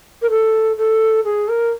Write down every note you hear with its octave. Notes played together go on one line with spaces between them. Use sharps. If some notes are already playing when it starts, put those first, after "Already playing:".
A#4
A4
A4
G#4
A#4